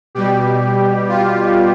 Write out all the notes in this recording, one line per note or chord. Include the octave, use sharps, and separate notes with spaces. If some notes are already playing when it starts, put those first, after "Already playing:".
B2 G3 G4
F4